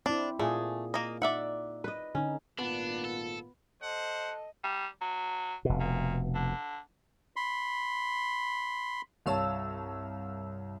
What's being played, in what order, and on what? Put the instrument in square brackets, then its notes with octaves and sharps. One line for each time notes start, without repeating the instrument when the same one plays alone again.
[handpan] C4 E4 [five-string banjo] D4
[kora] A#2 [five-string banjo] A3 [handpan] G#4
[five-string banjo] A#3 D#5
[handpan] D#4 [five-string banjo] D5 E5 F#5
[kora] B4 D#5
[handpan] D3 D#4 [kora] C#4
[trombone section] G#1 A#2 F4 [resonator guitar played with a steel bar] B3 [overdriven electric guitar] D4
[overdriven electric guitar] A4
[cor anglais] A4 [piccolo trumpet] C5 [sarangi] D#5 [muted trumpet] F#5
[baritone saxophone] G3
F#3
[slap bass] F1 B2
[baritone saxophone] A#2
D3
[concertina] B5 C6
[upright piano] C2 C#5 A5 [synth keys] G2 F5 E6